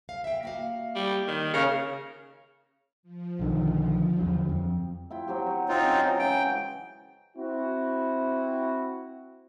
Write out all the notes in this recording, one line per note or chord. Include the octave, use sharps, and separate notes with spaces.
F5
E5 G5
A#3 F#4 F5
G3
D#3
C#3 A#4
F3
B1 D3 D#3
E2 D3 F#3
F2
E4 F4 G5
F#3 C4 G4
F#3 C5
C4 D#4 F4 C5 C#5
C#4 F#4
C#3 E3 G#3 G5
C4 E4 F#4